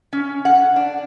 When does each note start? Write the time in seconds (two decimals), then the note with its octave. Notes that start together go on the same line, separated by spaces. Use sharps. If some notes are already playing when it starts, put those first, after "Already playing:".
0.13 C#4
0.45 F#5
0.76 D4